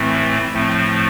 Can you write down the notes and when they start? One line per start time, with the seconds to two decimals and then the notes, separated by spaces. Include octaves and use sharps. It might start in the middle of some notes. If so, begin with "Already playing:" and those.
Already playing: A2 E3 A3 C4
0.53 A2 F3 A3 C4